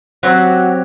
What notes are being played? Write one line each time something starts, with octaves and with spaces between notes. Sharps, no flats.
F#3 C4 F#4 G4